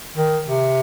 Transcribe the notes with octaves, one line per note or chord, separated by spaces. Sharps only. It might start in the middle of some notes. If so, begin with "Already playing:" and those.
D#3
C3